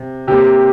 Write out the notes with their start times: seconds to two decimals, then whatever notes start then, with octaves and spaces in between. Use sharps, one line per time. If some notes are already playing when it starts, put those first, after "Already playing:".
Already playing: C3
0.28 C3 A#3 G4